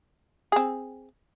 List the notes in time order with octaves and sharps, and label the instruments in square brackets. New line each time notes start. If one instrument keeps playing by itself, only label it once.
[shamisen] C4 G#4